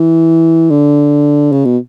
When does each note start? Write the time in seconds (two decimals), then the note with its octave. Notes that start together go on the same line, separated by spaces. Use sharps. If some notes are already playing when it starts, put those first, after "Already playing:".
Already playing: E3
0.70 D3
1.52 C#3
1.65 B2